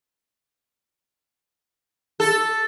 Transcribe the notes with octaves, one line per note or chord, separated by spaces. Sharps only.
A4